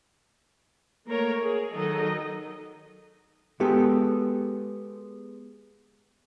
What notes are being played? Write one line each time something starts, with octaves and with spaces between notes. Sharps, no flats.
A3 A#3 A#4 C#5
G#4
D#3 F#3 D#4 A4 D#5
G#3 B3 G4 A4